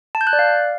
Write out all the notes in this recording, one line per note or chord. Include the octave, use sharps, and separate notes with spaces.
A5
G6
F#6
D5
F5